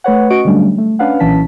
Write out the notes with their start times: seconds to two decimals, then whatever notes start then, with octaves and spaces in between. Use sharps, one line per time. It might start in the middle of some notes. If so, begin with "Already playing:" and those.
0.04 A3 B4 C#5 F#5
0.30 C#4 F#4 D#5 F#5 C#6 D7
0.45 D3 F#3 G3 A3 C#4 D4
0.78 A3
0.99 C#4 D4 B4 F5 F#5
1.20 B1 A#2 E3 C#4 A5 B6